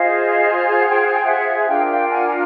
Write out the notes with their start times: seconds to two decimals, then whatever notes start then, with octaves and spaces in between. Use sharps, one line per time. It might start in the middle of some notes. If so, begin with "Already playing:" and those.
Already playing: F4 G#4 C5 D#5 F5
0.79 F#5
0.89 G5
1.02 F#5
1.13 G5
1.24 E5 F#5
1.66 D4 F4 A#4 F5 G5
1.90 F5 G5
2.11 F#5 G#5